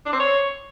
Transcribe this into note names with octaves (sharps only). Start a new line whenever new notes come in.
D4
C4
C#5